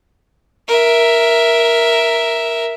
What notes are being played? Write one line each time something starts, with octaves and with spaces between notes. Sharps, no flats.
A#4 E5